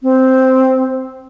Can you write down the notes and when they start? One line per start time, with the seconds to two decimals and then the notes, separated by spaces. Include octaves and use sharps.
0.03 C4